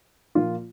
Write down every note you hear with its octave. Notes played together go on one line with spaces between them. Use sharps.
A#2 F3 A#3 F4